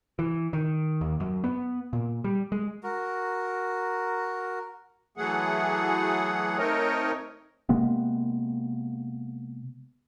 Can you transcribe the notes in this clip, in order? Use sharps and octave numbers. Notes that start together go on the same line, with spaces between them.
E3
D#3
D#2
F#2
B3
A#2
G3
G#3
F#4 A#4
E3 F#3 A3 G#4 F#5
A3 C4 D#4 A#4 C#5 D#5
C3 G#3 A#3 B3